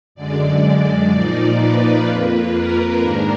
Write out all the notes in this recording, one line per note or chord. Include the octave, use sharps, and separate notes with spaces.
F#2 D3 G#3 D5
A#2 F3 A#3 D#4 D5
B4
F2 F3 A#3
A#4
G#2 D#3 A#3 D4